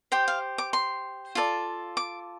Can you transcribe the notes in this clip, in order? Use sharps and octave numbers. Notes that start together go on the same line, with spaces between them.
G4 C5 G5
F5
D6
C6
F4 A4 D5
D6